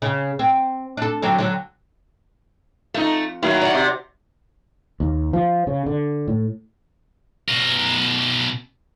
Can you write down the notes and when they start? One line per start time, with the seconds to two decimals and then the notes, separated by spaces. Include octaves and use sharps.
0.02 C#3
0.39 C4
0.97 D4 A4
1.22 D3 F#3 C4
1.38 D3 F#3
2.94 F2 A3 D#4
3.43 D#3 F#3 A#3 E4
3.61 D5 F#5
3.74 C3
5.00 D#2
5.33 F3
5.67 C#3
5.86 D3
6.28 A2
7.48 B2 A#4